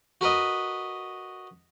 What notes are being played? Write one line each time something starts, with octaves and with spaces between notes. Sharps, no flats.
F#4 A#4 B4 D#5